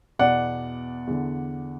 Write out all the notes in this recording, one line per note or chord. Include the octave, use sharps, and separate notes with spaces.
E2 B2 D5 F#5
E2 D3